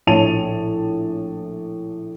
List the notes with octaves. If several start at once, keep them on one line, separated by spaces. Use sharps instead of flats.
A#1 A2 C#5 A5 D#7 F7